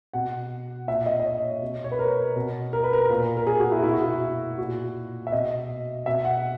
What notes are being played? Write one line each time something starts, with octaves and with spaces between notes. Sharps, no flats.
B2 F#5
A#2 E5
D#5
D#5
C#5
B2
C#5
B4
A#4
B2
A#4
B4
A#4
A#2
A#4
G#4
F#4
E4
B2 E4
F#4
E4
A#2 F#4
E5
B2 D#5
B2 E5
F#5